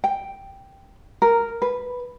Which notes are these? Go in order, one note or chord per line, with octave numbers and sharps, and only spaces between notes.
G5
A#4
B4